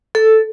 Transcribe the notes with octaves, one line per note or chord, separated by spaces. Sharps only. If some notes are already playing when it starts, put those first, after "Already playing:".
A4